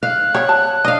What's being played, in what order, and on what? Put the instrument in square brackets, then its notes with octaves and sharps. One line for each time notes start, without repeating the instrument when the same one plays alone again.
[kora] F5 [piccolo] F#6
[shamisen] B3 G4 [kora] C#5
[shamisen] A5
[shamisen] D4 [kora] D#5 F5